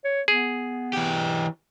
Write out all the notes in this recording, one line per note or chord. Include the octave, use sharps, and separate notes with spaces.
C#5
B3 G#4
E3 G4